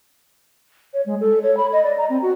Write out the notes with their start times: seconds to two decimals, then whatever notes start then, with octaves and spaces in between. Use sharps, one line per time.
0.94 C#5
1.06 G#3
1.21 A4
1.43 C#5
1.57 B5
1.73 D#5
1.84 D5
1.98 A#5
2.09 C4
2.22 F#4